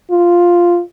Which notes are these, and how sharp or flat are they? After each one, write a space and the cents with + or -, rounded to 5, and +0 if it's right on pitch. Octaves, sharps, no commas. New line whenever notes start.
F4 +0